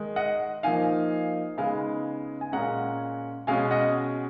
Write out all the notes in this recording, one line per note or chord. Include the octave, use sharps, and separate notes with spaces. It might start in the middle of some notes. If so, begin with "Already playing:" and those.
Already playing: D#3 G#3 D#4
D#5 F#5
F3 A#3 D#4 F5 G#5
C#3 G#3 B3 D#4 F5 G#5
G#5
A#2 G#3 C#4 F#5 A#5
B2 G#3 C#4 F5 G#5
D#5 F#5